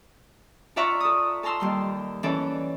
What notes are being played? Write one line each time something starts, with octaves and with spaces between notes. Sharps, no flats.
F4 D5 E5 F#5 A#5 C#6
A4 D#6
A4 A5 A#5 C6 E6
D#2 G3 C6
E3 C#4 A4 D5